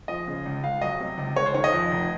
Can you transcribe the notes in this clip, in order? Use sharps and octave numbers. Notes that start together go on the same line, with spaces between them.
F3 D#5
C#3
C#2
C#2 F5
F#3 D#5
C3
C#2
C#2 C#5
C5
D#3 C#5
D#5
F2
F1